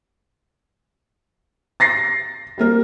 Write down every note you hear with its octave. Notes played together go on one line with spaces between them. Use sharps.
A6 A#6 C7
G3 A#3 A#4